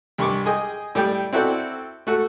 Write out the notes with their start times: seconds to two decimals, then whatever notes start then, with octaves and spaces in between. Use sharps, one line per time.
0.18 C2 G2 C#6 D6
0.46 G#4 D#5 G5
0.95 A2 G3 G4 D5 G5
1.33 C4 E4 F#4 A4 D5 G5
2.07 A3 F#4 A4